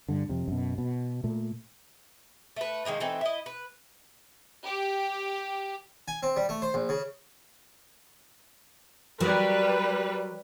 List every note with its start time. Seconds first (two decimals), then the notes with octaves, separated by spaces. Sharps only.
0.09 G2 D3
0.29 F2 C3
0.48 F#2 B2
0.78 B2
1.24 A#2 A3
2.56 A3 B4
2.85 D#3 G#3 A#3 D#4
3.00 E3 A3 C4 D#4
3.21 E4 D#5
3.46 B4
4.64 G4
6.08 G#5
6.23 C4
6.36 G3
6.49 A3
6.62 C5
6.74 A#1
6.89 C#3
9.20 F#3 G3 A#4 B4